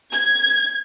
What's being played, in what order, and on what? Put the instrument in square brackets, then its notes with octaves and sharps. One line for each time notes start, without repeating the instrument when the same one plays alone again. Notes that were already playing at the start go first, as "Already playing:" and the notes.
[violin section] G#6